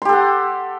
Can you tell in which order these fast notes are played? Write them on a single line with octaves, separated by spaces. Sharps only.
C6 G4 A4 F#5